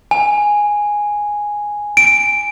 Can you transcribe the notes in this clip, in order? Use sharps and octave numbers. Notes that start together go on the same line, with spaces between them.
G#5
D7